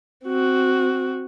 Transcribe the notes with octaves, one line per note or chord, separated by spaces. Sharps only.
C4 F#4